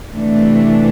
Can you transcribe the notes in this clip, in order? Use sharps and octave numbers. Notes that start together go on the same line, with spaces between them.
C3 E3 A3 D4